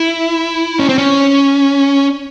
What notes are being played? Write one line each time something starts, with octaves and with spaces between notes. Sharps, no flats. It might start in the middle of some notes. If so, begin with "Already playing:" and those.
Already playing: E4
C#4
C4
C#4